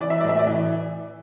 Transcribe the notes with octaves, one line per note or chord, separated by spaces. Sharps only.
E3 D5
E5
A2 D5
E5
D5
E3